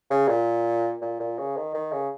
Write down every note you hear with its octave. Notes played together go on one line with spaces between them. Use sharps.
C#3
A#2
A#2
A#2
C#3
D#3
D#3
C#3